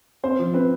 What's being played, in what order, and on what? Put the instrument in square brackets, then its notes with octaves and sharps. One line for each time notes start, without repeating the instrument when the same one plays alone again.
[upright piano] C4 C5
F3
C4 B4